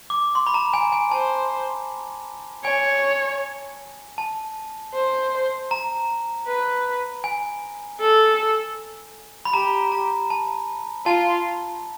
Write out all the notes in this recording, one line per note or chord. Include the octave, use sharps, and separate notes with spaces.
D6
C6
B5
A#5
G#5
G#5
C5 A5
C#5 G#5
A5
C5
A#5
B4
G#5
A4
B5
G4 A#5
A#5
A5
F4 A5